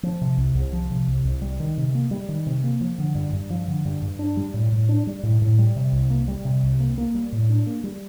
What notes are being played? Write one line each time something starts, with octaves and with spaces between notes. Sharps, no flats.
F3
C3
C2
C2
F3
C3
C2
C2
G3
D#3
C3
A#3
G3
D#3
C3
A#3
F3
D3
G2
G2
F3
D3
G2
G2
D4
G3
A2
A2
D4
G3
A2
A2
G3
C3
C2
A#3
G3
C3
C2
A#3
A#3
G3
A2
D4
A#3
G3